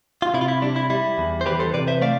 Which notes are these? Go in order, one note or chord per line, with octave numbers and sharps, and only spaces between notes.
F4
C3 E4
F4
E4
G3 D4
E4
G3 E4
E2
C5
E3 G4 B4
A4 C5
C3 B4 D5
C5 E5
A3 D5 F5